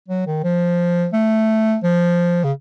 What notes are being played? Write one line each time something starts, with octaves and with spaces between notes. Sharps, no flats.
F#3
D#3
F3
A3
F3
C#3